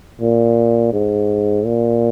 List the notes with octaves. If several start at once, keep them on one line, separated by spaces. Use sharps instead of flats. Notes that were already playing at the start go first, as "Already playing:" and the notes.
A#2
G#2
A#2